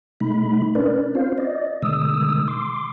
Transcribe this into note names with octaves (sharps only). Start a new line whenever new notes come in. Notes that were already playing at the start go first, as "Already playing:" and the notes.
B2 G#3 A3 D#4 B5
C#4 D4 A#4 B4 D5
C4 C#4 F4 C5 F5
D5 D#5
B2 D3 D#3 G#3 D#6 E6
C6 D6